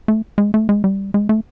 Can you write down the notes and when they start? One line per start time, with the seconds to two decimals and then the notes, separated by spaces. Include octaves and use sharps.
0.08 A3
0.38 G#3
0.54 A3
0.69 G#3
0.84 G3
1.14 G#3
1.29 A3